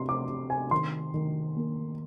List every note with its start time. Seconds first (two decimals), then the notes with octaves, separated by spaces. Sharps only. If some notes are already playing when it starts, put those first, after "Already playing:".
Already playing: C3 C6
0.09 D6
0.29 C3
0.50 G#5
0.71 D#3 C6
1.14 D#3
1.57 A#3